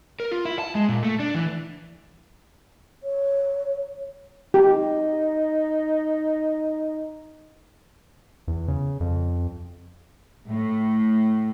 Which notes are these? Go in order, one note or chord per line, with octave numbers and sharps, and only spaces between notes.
A#4
F4
E4
A5
G#3
A#2
A3
D4
E3
C#5
D#4 G4
E2
C#3
F2
A2